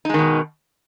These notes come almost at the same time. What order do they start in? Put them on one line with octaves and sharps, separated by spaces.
D#4 G#3 D#3 B2